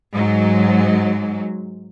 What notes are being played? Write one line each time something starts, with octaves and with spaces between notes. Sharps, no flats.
G#2 F#3